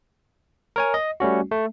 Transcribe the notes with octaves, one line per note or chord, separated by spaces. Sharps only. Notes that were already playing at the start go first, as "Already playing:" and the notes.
A#4 C#5 G#5
D#5
G3 A3 C#4 F#4
A3